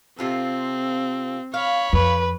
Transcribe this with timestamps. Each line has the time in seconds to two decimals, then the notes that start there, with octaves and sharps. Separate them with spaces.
0.19 C3 C4 F4 A4
1.54 C#5 F5 B5
1.93 F2 B4